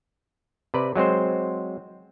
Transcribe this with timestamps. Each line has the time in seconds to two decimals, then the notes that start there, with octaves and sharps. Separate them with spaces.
0.74 C3 B4 D5
0.96 F#3 G#3 C4 C5